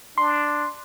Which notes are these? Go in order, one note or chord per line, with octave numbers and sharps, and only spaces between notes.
D4 C6